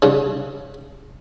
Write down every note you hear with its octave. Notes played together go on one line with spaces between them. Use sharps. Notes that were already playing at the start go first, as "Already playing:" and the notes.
G2 C#3